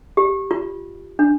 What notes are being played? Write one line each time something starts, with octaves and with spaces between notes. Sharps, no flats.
G4
F4
D4